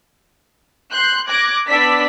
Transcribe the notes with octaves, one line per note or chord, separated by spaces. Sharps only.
C6 F#6 G6 C7
D6 F#6 G#6 A#6 D7
B3 D4 D5 E6 B6